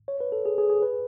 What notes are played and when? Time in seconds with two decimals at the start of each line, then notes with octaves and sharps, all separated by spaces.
0.08 C#5
0.21 B4
0.32 A4
0.46 G#4
0.58 G#4
0.70 G#4
0.82 B4